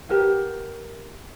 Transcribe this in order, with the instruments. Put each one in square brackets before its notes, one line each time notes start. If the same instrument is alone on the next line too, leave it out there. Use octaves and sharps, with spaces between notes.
[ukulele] G4 A#4 B4 F#5